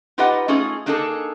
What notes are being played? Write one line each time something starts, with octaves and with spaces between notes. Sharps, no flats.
D#4 F4 G4 B4 D#5 F#5
A3 C#4 D#4 F4 G#4
A#3 D4 D#4 G#4 A4